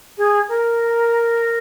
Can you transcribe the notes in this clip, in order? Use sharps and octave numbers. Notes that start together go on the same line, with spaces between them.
G#4
A#4